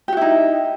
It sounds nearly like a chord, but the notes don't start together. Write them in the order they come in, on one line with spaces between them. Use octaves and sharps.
G4 F#4 E4 D#4